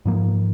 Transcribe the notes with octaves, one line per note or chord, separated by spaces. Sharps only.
G#2 F3 A#3